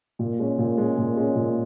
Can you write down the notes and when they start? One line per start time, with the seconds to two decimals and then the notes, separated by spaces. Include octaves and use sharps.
0.19 A#2
0.39 G#3 C#4
0.58 A#2
0.78 G#3 C#4
0.97 A#2
1.17 G#3 C#4
1.35 A#2